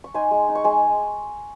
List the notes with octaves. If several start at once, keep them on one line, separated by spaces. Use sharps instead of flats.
C#6
D#4 G#5 C6
G#3
D#4
C#6
G#3 G#5 C6